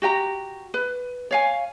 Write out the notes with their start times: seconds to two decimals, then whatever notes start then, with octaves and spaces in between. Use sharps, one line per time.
0.02 F#4 G4 G5 A#5
0.74 B4
1.31 C#5 F5 G#5